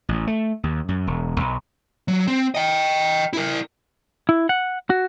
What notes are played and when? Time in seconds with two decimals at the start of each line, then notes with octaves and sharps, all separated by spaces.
0.09 A1
0.27 A3
0.63 D#2
0.89 F#2
1.07 E1
1.40 B1
2.08 F#3
2.27 C4
2.55 D#5 G5
3.33 E4 A#4
4.29 E4
4.49 F#5
4.90 F#4